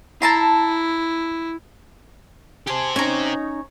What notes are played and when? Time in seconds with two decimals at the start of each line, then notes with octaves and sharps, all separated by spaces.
0.22 E4 A5 A#5 C6
2.67 G4 G#4 C5 A5
2.96 C#4 D#4 C#5 A#5